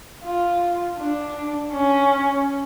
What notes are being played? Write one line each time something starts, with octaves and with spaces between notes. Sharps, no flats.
F4
D4
C#4